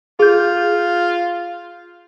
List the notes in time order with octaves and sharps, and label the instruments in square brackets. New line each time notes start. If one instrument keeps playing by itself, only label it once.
[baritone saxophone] F4 [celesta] G#4 G6